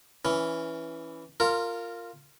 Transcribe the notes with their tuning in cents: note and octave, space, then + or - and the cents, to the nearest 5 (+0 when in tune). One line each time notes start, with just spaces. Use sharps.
E3 +0 C#4 +10
F4 +0 A#4 -20